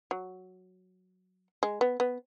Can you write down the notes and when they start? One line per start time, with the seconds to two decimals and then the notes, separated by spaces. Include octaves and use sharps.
0.11 F#3
1.63 G#3
1.81 B3
2.00 B3